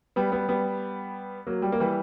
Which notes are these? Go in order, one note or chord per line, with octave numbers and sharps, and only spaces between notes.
G3 B3
G3 B3
G3 B3
F#3 A#3
G3
A#3
E3 G3